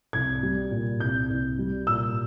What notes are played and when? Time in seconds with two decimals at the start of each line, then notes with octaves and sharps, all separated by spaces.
0.13 C2 G#6
0.43 G3
0.71 A#2
1.00 C2 G6
1.30 C2
1.59 G3
1.87 A#2 E6